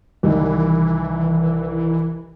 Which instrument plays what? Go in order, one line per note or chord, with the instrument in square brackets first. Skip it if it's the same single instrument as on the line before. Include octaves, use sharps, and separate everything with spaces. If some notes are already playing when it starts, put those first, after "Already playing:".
[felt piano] C2 D#3 [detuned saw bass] E3